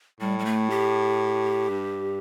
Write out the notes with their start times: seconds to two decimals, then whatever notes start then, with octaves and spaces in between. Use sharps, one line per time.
0.20 A2 G3
0.39 G3
0.45 A3
0.70 G4
1.69 G2